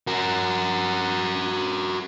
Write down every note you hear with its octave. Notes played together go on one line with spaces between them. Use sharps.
F#4 A#4